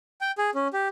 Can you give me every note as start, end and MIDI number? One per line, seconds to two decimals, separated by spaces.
0.21 0.31 79
0.38 0.50 68
0.55 0.68 61
0.73 0.88 67